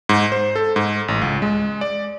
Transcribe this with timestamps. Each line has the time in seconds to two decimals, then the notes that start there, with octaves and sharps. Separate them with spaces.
0.09 G#2
0.32 C5
0.56 A4
0.76 G#2
1.08 A1
1.21 C#2
1.42 G#3
1.81 D5